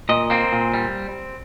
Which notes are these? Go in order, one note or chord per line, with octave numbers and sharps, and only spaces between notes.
A#2 D#5
A#3 C4
A#2
G3